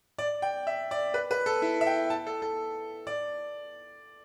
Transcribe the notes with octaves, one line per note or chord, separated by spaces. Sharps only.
D5
G5
E5
D5
B4
B4
A4
E4
E5
G5
A5
A4
A4
D5